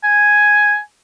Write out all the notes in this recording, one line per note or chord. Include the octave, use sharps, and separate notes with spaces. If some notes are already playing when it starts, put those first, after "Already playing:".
G#5